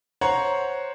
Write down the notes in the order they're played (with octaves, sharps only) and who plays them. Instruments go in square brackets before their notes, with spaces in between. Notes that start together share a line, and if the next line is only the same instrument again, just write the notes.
[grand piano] C5 C#5 F#5 A#5